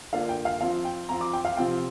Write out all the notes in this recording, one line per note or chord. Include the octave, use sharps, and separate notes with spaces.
D3 A#3 D4 F4 F5
G5
F5
F3 C4 F4 F5
G5
F3 C4 F4 A#5
D6
G5
F5
C3 F3 C4 F4 G5